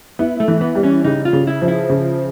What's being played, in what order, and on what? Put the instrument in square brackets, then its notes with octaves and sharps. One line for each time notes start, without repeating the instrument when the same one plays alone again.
[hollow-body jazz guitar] B3 [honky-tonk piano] E4
[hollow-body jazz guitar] A3
[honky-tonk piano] E3
[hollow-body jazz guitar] B3
[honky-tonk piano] G3
[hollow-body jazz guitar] C#4
[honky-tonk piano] C#3 [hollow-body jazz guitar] D#4
[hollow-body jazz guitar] F4
[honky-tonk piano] C#3
[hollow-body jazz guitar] E4
[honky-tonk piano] F3
[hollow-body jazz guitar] E4
[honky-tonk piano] C#3